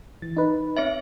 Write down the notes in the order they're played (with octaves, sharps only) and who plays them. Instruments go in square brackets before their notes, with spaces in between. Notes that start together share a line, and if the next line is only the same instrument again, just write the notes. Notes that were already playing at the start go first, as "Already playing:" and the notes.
[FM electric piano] E3 A6
D#4 B4
[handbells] C4 C#5 E5